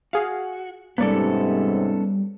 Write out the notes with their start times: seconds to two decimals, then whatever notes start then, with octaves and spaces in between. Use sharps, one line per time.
0.13 F#4 G#4 F5
0.98 G#2 C3 G3 A#3 B3 C#4 A4 D5